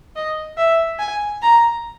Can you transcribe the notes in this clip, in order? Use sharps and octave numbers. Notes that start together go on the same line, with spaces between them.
D#5
E5
G#5
A#5